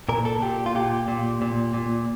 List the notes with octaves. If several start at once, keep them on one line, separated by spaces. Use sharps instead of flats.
A#2 A#4
A4
A#2 G4
F4
A#2 G4
A#2
A#2
A#2